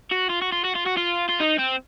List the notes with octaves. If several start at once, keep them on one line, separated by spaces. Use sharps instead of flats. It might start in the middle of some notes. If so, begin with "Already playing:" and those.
F#4
F4
F#4
F4
F#4
F4
F#4
F4
F4
D#4
C4